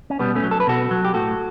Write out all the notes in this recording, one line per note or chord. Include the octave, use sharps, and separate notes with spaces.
C#4
B2 G3 B3
A3 C#4
F#3
A4
B4
B2 F#4 A4
F#3
G4
A2 F#4 A4